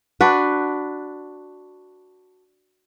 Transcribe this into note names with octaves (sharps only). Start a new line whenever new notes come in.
D4 F#4 B4